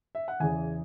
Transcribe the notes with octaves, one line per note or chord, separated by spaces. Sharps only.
E5
F#5
E2 C#3 E3 G#5